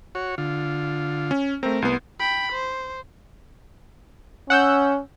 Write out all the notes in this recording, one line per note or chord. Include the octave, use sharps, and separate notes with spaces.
F#4 C#5
D3 F4
C#4
A3 C4 A#4
C2 B3 C6
G5 B5
C5
C#4 F#5 E6 G6